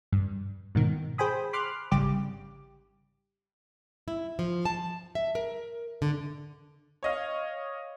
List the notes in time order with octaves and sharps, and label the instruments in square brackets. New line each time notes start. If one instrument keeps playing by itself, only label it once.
[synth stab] G2
G#2 B2 D#3
G#4 C5 G5 G#5 B5 D#6
B5 C6 D6 F6 F#6
G#1 C#3 G3 G4 D6
[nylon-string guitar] E4
F3
A5
E5
A#4
D3
[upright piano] C#5 D#5 F5